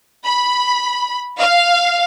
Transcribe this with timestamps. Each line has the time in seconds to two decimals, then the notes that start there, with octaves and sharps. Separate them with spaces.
0.25 B5
1.38 F5